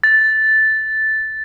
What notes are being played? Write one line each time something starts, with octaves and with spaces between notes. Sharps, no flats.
A6